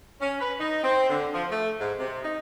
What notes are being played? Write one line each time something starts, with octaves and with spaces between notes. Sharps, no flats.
C#4
B4
D#4
C4
D3
F3
A3
G#2
C3
D#4